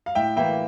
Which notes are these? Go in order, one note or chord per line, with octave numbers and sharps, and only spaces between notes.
F5
A2 E5 G5
E3 A#3 E4 E5 G5